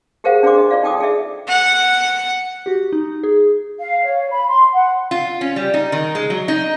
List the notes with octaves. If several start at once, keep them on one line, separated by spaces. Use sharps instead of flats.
G4 G#4 A#4 C5 F5 F#5
D4 G#4 C5 D5 C6 D6
D#5
F4 D5 F5
D#4 A4 G5 D6 D#6
G#4 A4 D5 E5
F#5
F#4 G4
D#4
G#4
F5
C#5
B5
C6
F#5
F4
C#4
G3
D#4
D#3
G#3
F#3
D#4